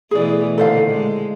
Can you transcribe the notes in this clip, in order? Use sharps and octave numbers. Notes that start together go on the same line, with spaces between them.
B2 E3 A3 G#4 D5
A#2 D3 D#3 A4 C5 F5
G#3